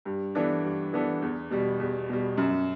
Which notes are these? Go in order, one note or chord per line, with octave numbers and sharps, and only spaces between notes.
G2
E3 B3 D4 A4
G2
E3 B3 D4 A4
E2
B2 G3
E2
B2 G3
F#2